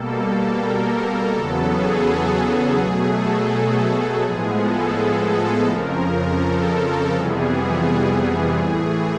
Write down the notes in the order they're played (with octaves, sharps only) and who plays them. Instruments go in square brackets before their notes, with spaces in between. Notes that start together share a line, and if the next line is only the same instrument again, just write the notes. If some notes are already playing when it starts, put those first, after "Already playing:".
Already playing: [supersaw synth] B2 G3 A#3 A4
A#4
E2 C#3 F#3 B3 A4
G#4
G#4
B2 F#3 A3
A4
G#4
A2 F3 G#3 B3
A4
A4
F2 C#3 F3 A#4
A4
F2 C3 E3 G3 B3 G#4
A2 E3 A3 G#4